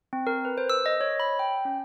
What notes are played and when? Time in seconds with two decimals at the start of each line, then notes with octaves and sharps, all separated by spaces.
0.13 C4
0.27 A#4
0.45 B4
0.58 C5
0.70 E6
0.86 D#5
1.01 C#5
1.20 B5
1.39 G5
1.65 C#4